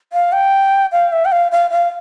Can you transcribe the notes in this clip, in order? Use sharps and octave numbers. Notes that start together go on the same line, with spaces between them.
F5
G5
F5
E5
G5
F5
F5
F5